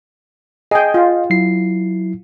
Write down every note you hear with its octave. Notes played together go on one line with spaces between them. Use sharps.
G#4 D#5 G5
F4
F#3 E4 C7